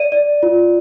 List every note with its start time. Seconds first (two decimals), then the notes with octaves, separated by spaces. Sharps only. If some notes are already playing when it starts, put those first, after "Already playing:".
Already playing: D5 D#7
0.12 D5
0.43 F4